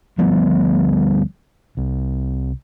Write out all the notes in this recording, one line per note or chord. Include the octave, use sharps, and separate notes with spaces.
D2 F3 G3 B3
C2